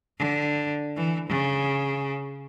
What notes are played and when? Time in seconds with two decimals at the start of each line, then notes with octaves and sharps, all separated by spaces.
0.18 D3
0.96 E3
1.29 C#3